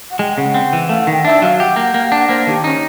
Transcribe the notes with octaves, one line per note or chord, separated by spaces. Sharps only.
F#5
G#3 G5
C#3 F#5
C4
E3
A3 F5
F#5
D#3
G5
D4 E5
F#3 F5
G4 F#5
A#3
A#3
D4
A#3 C5
D#3 G4
C#4 D#4